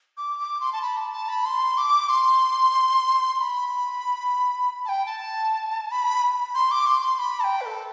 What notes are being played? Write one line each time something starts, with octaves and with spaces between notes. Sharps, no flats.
D6
D6
C6
A5
B5
A5
A5
B5
C6
D6
C6
C6
B5
A5
G5
A5
B5
C6
D6
C6
C6
B5
A5
G5
B4
A4